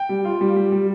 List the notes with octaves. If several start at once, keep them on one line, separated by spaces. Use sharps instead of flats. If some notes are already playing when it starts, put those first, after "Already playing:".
Already playing: G5
G3
F4
G3
G3
G3